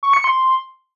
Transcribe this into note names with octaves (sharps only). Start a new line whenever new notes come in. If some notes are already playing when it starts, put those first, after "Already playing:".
C#6
C#7
C6